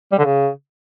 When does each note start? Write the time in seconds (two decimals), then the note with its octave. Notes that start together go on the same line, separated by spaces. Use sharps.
0.12 G3
0.18 D3
0.25 C#3